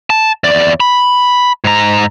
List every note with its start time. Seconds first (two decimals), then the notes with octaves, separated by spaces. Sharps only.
0.10 A5
0.44 E2 D5
0.80 B5
1.64 G#2 A#5